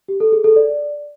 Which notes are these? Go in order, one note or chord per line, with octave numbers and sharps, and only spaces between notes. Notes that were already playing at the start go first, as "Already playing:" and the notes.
G4
A4
G#4
A4
D5